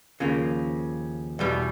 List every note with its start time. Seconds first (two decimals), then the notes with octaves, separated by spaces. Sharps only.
0.20 D#2 C#3 F3 A#3
1.39 E2 B2 G3